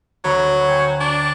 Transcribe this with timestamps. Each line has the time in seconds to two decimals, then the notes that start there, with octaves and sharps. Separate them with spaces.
0.24 D2 F#3 B5 C#6
0.68 G5 G#5
1.00 D4